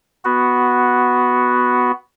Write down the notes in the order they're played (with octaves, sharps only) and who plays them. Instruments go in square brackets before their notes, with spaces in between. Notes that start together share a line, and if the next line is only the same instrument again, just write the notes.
[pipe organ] B3 F#4